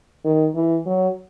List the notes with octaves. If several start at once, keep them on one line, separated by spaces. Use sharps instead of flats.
D#3
E3
F#3